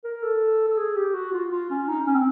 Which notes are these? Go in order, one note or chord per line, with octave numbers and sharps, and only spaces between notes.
A#4
A4
A4
G#4
G4
F#4
F4
F4
C#4
D#4
C#4
C4